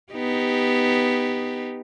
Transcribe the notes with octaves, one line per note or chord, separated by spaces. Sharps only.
B3 D#4 G4